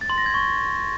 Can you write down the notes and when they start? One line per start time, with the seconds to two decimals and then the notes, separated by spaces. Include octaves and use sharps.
0.01 A6
0.10 C6
0.18 A#6
0.26 G#6
0.34 C#6